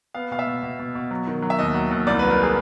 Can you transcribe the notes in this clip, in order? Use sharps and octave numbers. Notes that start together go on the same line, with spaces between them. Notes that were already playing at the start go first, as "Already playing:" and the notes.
B3 F5
B2 F5
E5
B2
B2
B2
B2
F#3
D#3
F#3
E5
D#2 D#5
F#3
D#2
C2 D5
B4
F#3
A#4
G#4